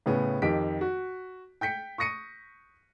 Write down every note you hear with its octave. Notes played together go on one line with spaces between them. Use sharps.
A2 C#3 B3
F2 D#3 G4 B6 D7
F#4
G5 G6 B6 C#7
C#6 D#6 A#6 C#7 D#7